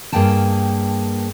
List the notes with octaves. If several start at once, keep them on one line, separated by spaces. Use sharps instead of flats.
G2 A#3 G#4 G5 A5